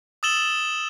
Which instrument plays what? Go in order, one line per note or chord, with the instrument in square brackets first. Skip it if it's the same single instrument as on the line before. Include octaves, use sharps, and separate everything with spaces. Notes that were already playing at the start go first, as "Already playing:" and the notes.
[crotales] D#6 E6 A6 E7 F#7 G7